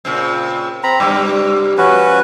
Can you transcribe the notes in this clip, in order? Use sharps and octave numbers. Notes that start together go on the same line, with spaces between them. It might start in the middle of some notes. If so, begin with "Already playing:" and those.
A#2 C#3 C4
C4 A#5 B5
G2 C#3 G3 D6
F3 C#4 F#4 B4